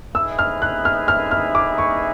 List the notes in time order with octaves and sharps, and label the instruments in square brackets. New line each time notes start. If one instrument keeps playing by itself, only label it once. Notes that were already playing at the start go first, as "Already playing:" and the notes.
[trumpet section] D#4 G#4 B4 E5 [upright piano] E6
[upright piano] F6
F#6
F6
F6
F6
D6
C#6